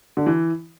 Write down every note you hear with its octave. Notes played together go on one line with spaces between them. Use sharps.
D3
E3